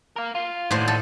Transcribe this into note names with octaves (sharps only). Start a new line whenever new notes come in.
A#4 F5
F4
D#2 A2 D3 C5
A4